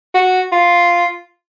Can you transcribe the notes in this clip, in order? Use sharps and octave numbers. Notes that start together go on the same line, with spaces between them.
F#4
F4